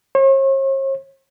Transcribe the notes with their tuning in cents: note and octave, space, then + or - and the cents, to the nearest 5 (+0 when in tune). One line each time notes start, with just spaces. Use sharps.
C#5 -45